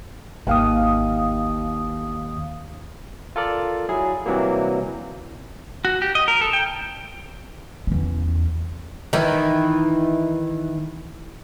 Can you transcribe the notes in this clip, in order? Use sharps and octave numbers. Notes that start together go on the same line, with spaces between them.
G#1 D#2 F5 D#6
F4 A4 A#4 D5
F#3 E4 G#4
C3 E3 F#3 G3 A#3
F#4
G4
D#5
A#4
A4
G5
E2 C#4
D#3 E3